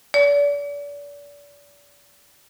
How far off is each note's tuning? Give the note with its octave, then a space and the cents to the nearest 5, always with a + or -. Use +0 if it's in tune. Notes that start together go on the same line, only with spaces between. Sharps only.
D5 -35